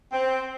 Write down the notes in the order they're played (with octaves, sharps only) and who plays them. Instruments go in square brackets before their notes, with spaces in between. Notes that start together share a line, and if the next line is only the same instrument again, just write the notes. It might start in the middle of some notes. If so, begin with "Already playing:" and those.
[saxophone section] C4